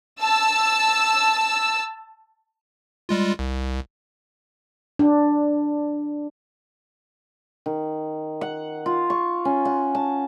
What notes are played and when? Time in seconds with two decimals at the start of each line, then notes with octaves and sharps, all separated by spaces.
0.20 A5 E6
3.09 G3 G#3 F4
3.39 C2
4.99 D4
7.66 D#3
8.41 F#5
8.86 F4
9.10 C#6
9.45 C#4
9.65 F#5
9.95 A5